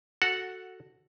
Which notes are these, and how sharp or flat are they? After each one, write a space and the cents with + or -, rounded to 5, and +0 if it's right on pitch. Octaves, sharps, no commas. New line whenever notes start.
F#4 +0 A4 +10 F#5 -10